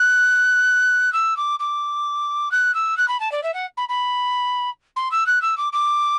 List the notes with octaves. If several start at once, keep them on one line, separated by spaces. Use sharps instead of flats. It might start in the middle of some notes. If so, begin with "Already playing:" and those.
Already playing: F#6
E6
D6
D6
F#6
E6
F#6
B5
A5
D5
E5
F#5
B5
B5
C6
E6
F#6
E6
D6
D6